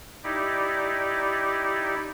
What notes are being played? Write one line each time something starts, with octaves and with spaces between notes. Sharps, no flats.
D#4 E4 G4 D5